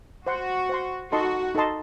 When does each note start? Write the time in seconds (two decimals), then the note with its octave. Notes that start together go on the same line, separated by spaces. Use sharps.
0.27 F#4 C5 F#5 C6
0.69 C5 F#5 C6
1.12 D#4 F#4 A4 D#5 A5 C6
1.55 D#4 A4 D#5 A5 C6